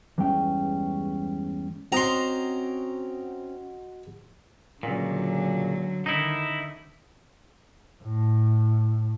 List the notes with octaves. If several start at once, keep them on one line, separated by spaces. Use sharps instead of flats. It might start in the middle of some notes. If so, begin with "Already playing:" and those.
E2 G2 G#3 C#4 G5
C4 C#4 F#4 D#5 A#5 C6
C#2 A#2 D3 F#3
D3 D#3 D#4 E4
A2